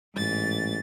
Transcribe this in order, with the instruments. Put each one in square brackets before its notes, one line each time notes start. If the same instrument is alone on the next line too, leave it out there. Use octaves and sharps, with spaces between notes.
[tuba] A1 [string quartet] G#2 A6